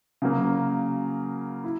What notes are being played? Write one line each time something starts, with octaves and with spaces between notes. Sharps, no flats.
C#3 F#3 A#3
E4